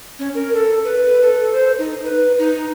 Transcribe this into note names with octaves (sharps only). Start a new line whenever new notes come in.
C#4
A#4
A4
B4
A4
C5
D#4
B4
D#4